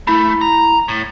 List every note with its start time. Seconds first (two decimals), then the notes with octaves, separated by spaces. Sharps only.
0.07 A3 E4 B5
0.41 A#5
0.88 A2